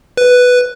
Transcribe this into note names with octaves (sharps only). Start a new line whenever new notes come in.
B4